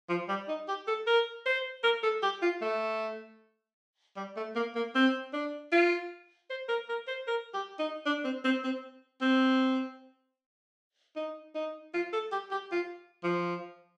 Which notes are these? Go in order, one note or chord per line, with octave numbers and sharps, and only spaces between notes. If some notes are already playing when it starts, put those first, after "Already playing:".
F3
G3
D#4
G4
A4
A#4
C5
A#4
A4
G4
F4
A3
G3
A3
A#3
A#3
C4
D4
F4
C5
A#4
A#4
C5
A#4
G4
D#4
D4
C4
C4
C4
C4
D#4
D#4
F4
A4
G4
G4
F4
F3